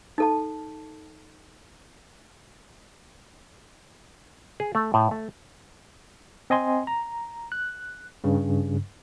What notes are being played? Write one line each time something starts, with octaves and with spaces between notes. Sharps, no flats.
D#4 A4 A5
G#4
A3
A2
A3
C4 D#5 G#5 C6
A#5
F#6
G2 C#3